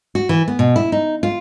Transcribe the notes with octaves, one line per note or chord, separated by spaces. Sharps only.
F#4
E3
B3
B2
E4
D#4
F4